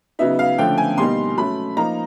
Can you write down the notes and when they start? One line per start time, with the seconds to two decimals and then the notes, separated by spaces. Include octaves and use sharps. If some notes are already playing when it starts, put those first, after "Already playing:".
0.19 C#3 F#3 B3 D#4 E5
0.39 F5
0.58 D3 F3 A3 C#4 F4 G5
0.78 G#5
0.98 B2 G3 A#3 D#4 C6
1.37 F#3 A3 C#4 B5
1.77 F3 A#3 D#4 A#5